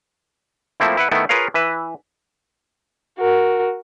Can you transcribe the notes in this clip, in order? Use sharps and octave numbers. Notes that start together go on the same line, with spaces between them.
F3 A3 A#3 C4 E4
E4 B4 F#5
D#3 A3 B3 E4
F4 G#4 A#4 B4 C#5 F5
E3 B4 E5
F#4 A#4